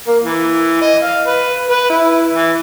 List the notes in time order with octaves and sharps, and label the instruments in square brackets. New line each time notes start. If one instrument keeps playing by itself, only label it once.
[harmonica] A#3
E3
D#5
F5
B4
B4
E4
E3